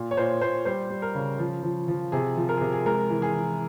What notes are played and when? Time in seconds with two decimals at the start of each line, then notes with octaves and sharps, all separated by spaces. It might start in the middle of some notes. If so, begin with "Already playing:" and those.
Already playing: A#2
0.11 C#5
0.17 A#2 C5
0.41 A#2 C5
0.65 G3 C5
0.90 G3
1.02 A#4
1.15 C#3
1.39 F3
1.63 F3
1.88 F3
2.12 C3 G#4
2.37 F3
2.49 A#4
2.57 G#4
2.61 C3
2.73 G#4
2.86 G#3 A#4
3.10 E3
3.22 G#4
3.35 E3